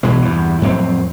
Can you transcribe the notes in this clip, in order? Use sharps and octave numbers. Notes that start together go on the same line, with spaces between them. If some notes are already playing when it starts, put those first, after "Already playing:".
B1 B2 E3 G#3
E2 G2 E3
F2 A2 F#3 C4